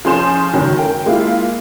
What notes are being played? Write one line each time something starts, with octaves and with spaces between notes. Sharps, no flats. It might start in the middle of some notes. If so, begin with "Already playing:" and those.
F3 C#4 G#4 C6 G6 E7
C#2 F#2 D#3 F#3
A#4 G5
G#3 A#3 E4 F4